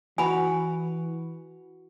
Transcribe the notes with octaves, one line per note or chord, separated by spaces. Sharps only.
E3 F#4 B4 G#5 B5